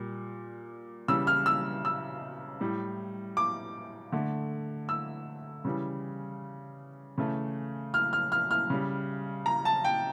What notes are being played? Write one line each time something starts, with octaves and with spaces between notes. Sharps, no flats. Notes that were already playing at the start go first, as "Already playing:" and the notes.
Already playing: A#2 G3
C#3 E3 G3 E6
F6
E6
E6
A2 G3
D6
D3 A3
E6
C#3 E3 G3
C#3 E3 A3
F6
F6
F6
F6
C#3 G3
A#5
A5
G5